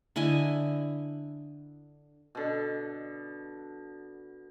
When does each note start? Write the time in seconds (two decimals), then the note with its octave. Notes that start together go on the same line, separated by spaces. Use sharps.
0.16 D3 E4 D#5 G#5
2.35 B2 D3